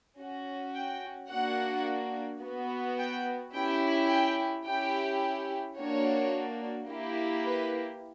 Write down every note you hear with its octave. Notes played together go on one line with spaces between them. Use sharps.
C#4 F#4
G5
A#3 D4 F#4 F#5
B3 F#4
G5
C#4 E4 G4 G5
G5
C#4 E4 G4 G5
A#3 D4 F#4 C#5
A#3 E4 G4
B4